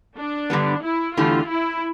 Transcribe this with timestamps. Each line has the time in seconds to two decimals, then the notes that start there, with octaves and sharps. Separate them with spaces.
0.18 D4
0.50 G2 D3 G3 B3
0.84 E4
1.17 E2 D3 A3 E4 F4 G4
1.50 E4